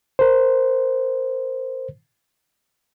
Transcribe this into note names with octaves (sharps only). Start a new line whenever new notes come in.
A#4 C5